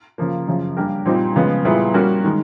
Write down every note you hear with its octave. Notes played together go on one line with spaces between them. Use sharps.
C#3 F3 A#3
F#2 C#3 F3
G3 A#3 D4 G4 A#4
A#2 G3 C4 D#4 G4
C#3 F3 G#3 B3
A#2 G3 B3 E4 G#4
G3 A#3 C#4 F#4 A#4
D#3 G#3